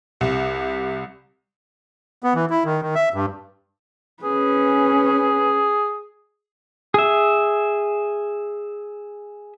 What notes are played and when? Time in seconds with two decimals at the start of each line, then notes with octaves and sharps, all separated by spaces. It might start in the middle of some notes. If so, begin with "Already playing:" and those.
0.21 C2 G4
2.24 B3
2.35 E3
2.50 E4
2.65 D#3
2.82 D#3
2.95 E5
3.14 G2
4.24 C#4 G#4 B4
6.94 G#4 E5